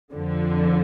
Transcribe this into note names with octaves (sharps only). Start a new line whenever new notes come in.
F2 D3 F3